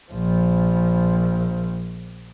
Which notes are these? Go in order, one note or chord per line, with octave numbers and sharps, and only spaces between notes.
A#1 F3